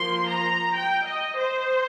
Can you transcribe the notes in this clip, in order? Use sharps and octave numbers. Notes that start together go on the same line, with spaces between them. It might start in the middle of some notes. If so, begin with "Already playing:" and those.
Already playing: F3 A#3 C6
A#5
G5
D#5
C5